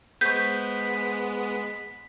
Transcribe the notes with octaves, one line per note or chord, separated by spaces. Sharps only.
G#3 B3 G#4 C5 C#6 G6 B6